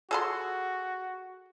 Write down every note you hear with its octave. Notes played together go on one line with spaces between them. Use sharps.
F#4 G#4 A4 C6